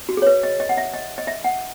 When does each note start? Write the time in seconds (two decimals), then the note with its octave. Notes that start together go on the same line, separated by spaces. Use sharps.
0.09 F#4
0.17 G#4
0.22 C#5
0.27 B4
0.43 D#5
0.60 D#5
0.69 F#5
0.77 E5
0.94 D#5
1.18 D#5
1.27 E5
1.44 F#5